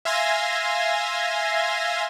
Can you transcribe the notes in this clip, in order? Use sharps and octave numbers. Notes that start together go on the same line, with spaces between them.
E5 F5 G#5 C6 G#6 A#6